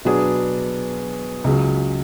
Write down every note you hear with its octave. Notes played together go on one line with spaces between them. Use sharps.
B2 F#3 B3 D4 G#4
C#2 C#3 F#3